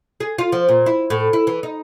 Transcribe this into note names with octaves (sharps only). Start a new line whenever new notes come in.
G#4
F4
F3
A#2
E4
A2
E4
E3
D#4